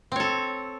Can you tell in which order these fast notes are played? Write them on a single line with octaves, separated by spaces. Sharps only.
C4 C#5 A4